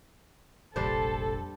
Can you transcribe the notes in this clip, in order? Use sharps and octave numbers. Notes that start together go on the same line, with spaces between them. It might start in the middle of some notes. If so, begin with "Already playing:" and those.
F1 A#1 G3 D4 A4 C5